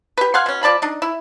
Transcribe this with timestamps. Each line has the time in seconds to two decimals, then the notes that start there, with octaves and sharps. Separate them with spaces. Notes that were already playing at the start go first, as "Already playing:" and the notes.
0.17 G4 B4
0.34 F5 F#5 G#5 C6
0.46 B2 C#4
0.63 F3 D5 A5 B5
0.82 D4 D#4
1.02 E4